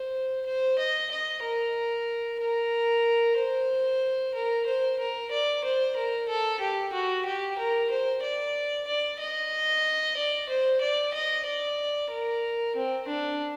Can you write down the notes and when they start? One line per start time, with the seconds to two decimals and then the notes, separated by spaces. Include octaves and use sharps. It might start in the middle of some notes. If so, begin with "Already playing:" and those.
Already playing: C5
0.46 C5
0.79 D#5
1.11 D#5
1.43 A#4
2.40 A#4
3.38 C5
4.34 A#4
4.66 C5
4.99 A#4
5.31 D5
5.64 C5
5.96 A#4
6.29 A4
6.60 G4
6.93 F#4
7.25 G4
7.58 A#4
7.91 C5
8.23 D5
8.87 D5
9.20 D#5
10.17 D5
10.49 C5
10.82 D5
11.14 D#5
11.46 D5
12.11 A#4
12.76 C4
13.08 D4